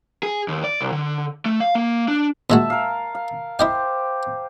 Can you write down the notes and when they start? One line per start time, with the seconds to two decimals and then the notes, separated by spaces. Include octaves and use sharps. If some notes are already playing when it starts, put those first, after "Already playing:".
0.23 G#4
0.48 D#2
0.64 D5
0.81 C2
0.92 D3
1.46 A3
1.60 F5
1.75 A#3
2.08 D4
2.50 A#2 G#3 F#4 E5 A5
2.70 A#4 F5
3.15 F5
3.59 E4 G4 C5 D#5 F5